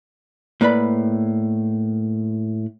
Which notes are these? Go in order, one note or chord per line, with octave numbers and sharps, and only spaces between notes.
A2 A#3 B4 D5 B5